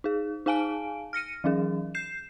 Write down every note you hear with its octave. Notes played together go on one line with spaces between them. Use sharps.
D#4 G#4
D#4 G#4 F5 G#5 A5 D7
F6 A#6 C#7 D#7
E3 F#3 C#4 G#4
G6 C7 E7